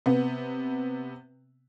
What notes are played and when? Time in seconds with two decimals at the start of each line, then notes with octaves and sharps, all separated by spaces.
0.06 C3 B3